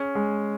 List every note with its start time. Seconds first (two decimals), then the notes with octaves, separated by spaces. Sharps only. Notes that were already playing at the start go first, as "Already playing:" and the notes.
Already playing: C#4 G#4
0.15 G#3